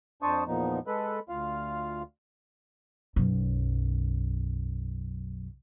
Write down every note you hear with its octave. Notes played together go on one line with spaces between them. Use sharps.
F2 D4 C5 A5 C#6 D#6
E2 A#2 F3 B3 D#4
G#3 A4 B4 B5
D2 F4 F5
B1 F#2